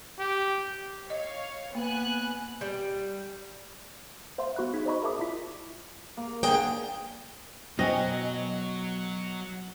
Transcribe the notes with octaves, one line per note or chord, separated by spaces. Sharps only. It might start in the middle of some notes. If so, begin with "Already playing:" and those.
G4
C#5 D#5 F5
A#3 B3 G#5 F#6
G3
C5 E5 F5 C6
B3 F#4 B5 F#6
D#4 G#4 G#6 B6
C5 D5 D#5 A#5 B5 C#6
G#4 A#4 E5 A5 D6 D#6
E4 F4 B5 B6
A#3
D3 G#4 G5
B2 F#3 C5 D#5 G5 G#5